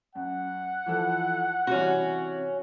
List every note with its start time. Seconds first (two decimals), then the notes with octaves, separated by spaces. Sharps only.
0.15 F#2 F#5
0.86 E3 F3 A4
1.67 C3 E3 G3 C#4 F#4